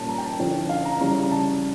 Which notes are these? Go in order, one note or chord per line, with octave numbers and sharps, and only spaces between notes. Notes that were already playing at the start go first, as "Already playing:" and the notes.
Already playing: A#2 G3 C#4 A5
A#5
G5
A5
D3 F3 C#4 E4
F5
A#5
C#3 G3 C#4 E4 A#5
A#5
A5